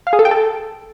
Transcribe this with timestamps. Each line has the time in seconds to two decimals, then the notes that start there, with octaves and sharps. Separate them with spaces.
0.07 F5
0.13 G#4
0.19 A4
0.25 G5
0.31 A4